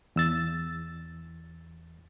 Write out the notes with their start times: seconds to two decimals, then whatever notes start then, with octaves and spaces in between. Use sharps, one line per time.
0.16 E2 E6 A6